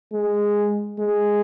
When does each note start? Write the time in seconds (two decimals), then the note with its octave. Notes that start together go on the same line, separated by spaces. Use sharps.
0.13 G#3
0.99 G#3